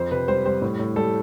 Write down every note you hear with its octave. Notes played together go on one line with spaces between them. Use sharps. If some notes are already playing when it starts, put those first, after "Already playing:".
Already playing: F2 C5
C3 B4
G3 C5
G3 C5
A2
A2
G3 A4